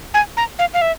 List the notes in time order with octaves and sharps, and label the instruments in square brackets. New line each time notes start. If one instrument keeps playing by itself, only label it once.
[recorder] G#5
A#5
F5
F5
E5